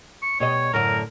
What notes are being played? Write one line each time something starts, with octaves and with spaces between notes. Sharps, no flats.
C#6
B2 G3 C#5 D#5
F#2 A2 D3 A#4